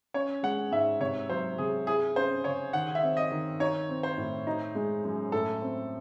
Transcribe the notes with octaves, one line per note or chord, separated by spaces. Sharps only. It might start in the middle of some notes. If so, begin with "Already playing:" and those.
C#4 C#5
G#3 F#5
G#2 E5
C3 C#5
F#3 C5
C3 G#4
E4 G#4
C#4 C5
C#3 C#5
D#3 F#5
E5
C4
D#5
D#3
D#4 C#5
C4
C5
A2
D#4
G#3
F#2
A2 A4
C4